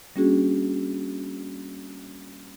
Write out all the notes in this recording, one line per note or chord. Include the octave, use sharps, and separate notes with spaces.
G3 A#3 C#4 D4 F#4 G#4